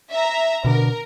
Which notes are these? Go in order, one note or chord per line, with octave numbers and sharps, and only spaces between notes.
E5 A#5
B2 D3 A#4